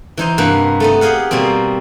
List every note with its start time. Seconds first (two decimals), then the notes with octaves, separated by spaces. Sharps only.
0.17 E3 D#4 C5 D#5
0.38 G2 C3 A#3 B4 F#5
0.80 A3 B3 D#4
1.01 G4 G#4 D#5 F5 F#5
1.31 B2 G3 A#3 C4